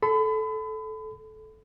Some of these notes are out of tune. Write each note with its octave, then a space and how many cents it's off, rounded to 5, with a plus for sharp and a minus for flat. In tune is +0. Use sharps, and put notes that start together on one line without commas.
A4 -15 B5 +35